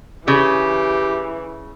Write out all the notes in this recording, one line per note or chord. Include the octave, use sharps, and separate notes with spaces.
C#3 E3 G4